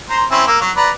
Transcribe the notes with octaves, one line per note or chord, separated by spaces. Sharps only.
C5 A#5
C4 C#4 E4
A#3 E6
F#3
B4 D5 A#5